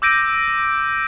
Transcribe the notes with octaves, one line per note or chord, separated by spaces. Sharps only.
D6 E6 G6 A#6 D7 D#7